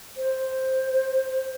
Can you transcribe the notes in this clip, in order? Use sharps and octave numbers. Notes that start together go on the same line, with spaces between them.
C5